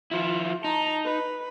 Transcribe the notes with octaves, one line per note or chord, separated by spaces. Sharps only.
F3 E4 F4
D#4 A5 A#5
B4